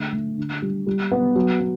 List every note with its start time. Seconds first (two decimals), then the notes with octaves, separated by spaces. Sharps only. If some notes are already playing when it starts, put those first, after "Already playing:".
Already playing: D3 A3
0.12 A3
0.37 D3
0.62 G3
0.87 G3
1.11 B3
1.36 F#3
1.60 B3